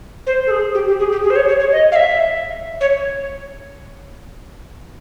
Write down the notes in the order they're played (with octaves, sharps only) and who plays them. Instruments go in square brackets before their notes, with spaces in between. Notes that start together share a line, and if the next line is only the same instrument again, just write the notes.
[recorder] C5
A4
G#4
G4
G4
G#4
G4
G#4
C5
C#5
C#5
C#5
D#5
F5
E5
C#5